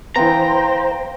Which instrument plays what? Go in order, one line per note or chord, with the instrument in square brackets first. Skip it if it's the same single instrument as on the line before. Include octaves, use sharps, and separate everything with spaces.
[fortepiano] E3 B3 [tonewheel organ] C5 [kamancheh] F5 G5 [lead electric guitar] A#5